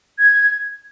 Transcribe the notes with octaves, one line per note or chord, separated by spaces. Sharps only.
G#6